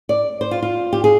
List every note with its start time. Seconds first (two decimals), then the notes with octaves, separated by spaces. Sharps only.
0.09 D5
0.41 C5
0.51 F4
0.62 F4
0.93 G4
1.04 G#4